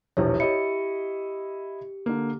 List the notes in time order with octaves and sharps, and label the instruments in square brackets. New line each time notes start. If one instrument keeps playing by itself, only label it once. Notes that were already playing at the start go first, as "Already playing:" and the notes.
[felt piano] E1 A#1 [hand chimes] E4 G4 C#5
[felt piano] E4 D#5 [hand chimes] G4 C#7
[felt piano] D3 A#3